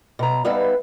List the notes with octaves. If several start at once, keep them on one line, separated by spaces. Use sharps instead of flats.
B2 A#5
G3 B3 D#4 B4 E5 F5